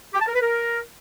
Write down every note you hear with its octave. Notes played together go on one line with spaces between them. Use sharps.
G4
A5
A#4
B4
A#4